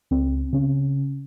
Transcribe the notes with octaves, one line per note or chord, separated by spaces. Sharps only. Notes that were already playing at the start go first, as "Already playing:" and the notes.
C#2 C4
C#3 C#4